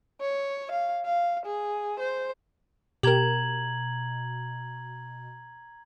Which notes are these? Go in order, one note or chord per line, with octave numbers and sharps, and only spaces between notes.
C#5
F5
F5
G#4
C5
B2 G4 A#4 A#5 G#6 F#7